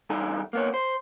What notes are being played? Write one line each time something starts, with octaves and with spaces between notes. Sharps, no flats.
G2 E3 D#4 A4 G#5
A#3 B3 C#5
C5